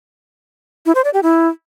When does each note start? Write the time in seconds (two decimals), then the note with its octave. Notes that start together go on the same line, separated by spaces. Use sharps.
0.86 E4
0.95 C5
1.04 D5
1.13 G4
1.23 E4